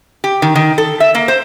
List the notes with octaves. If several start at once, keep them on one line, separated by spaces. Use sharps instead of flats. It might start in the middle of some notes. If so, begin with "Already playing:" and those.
G4
D#3
D#3
A4
E5
A#3
C5